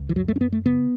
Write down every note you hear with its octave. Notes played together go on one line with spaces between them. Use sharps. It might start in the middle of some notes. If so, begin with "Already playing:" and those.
Already playing: C#2
E3
F#2 F#3
A3
C#4
F#2 B3
A3
C#3 B3